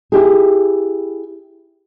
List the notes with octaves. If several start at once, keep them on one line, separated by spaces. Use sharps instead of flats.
E4 G4 G#4